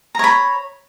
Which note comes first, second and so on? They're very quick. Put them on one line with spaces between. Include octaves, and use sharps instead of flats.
A#5 C#5 B5